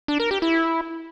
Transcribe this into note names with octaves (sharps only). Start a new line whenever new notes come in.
D4
A#4
G4
E4